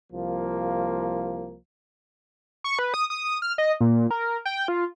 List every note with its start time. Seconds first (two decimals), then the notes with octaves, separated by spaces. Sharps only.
0.13 C2 F3 A#3
2.64 C#6
2.79 B4
2.94 D#6
3.10 D#6
3.42 F6
3.58 D#5
3.81 A#2
4.11 A#4
4.45 G5
4.68 F4